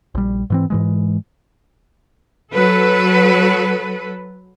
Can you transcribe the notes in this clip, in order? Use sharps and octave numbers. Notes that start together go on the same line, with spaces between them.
A#1 G3
G#2 E3 C4
G#2 E3 G#3
F#3 A4 B4